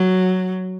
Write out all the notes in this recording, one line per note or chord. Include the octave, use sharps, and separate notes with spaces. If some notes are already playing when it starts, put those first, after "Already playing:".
Already playing: F#3